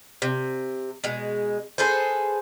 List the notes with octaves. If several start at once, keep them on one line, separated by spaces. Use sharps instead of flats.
C3
B2 G#3
G#4 A4 B4 C5